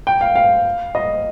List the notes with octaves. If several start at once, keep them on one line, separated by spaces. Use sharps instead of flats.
G5
F5
F5
D#5